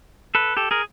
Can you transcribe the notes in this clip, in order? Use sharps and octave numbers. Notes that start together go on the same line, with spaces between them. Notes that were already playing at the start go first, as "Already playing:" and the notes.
A4 B4
G4 A4
G#4 A#4